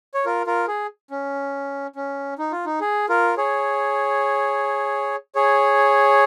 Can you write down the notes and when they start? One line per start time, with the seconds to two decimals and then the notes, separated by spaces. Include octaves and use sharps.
0.14 C#5
0.25 F4 A#4
0.46 F4 A#4
0.68 G#4
1.10 C#4
1.96 C#4
2.38 D#4
2.52 F4
2.66 D#4
2.80 G#4
3.09 F4 A#4
3.37 G#4 C#5
5.35 G#4 C#5